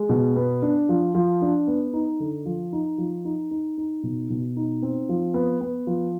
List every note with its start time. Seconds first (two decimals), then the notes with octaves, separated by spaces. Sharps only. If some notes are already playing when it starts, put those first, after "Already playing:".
Already playing: G#3
0.09 B2
0.36 B3
0.62 D4
0.89 F3
1.15 F3
1.42 D4
1.67 B3
1.93 D#4
2.20 D3
2.46 F3
2.73 D#4
2.98 F3
3.25 D#4
3.51 D#4
3.78 D#4
4.03 B2
4.30 B2
4.57 D#4
4.82 C4
5.09 F3
5.34 B3
5.61 B3
5.87 F3